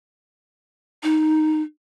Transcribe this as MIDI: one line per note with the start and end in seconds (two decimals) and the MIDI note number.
1.03 1.61 63